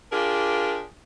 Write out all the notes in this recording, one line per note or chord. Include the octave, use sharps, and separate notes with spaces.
D4 F4 G4 G#4 A#4